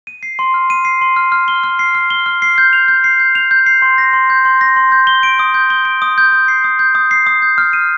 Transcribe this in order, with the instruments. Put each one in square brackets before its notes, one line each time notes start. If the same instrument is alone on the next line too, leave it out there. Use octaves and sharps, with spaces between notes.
[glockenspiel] D#7
C7
C6
F6
D#7
C7
C6
F6
F6
G7
F6
C7
F6
G7
F6
C7
G6
F7
G6
C7
G6
F7
G6
C7
C6
A#6
C6
G6
C6
A#6
C6
G6
G7
D7
D#6
G6
G7
D7
D#6
G6
D#6
C7
D#6
G6
D#6
C7
D#6
G6
F6
D#7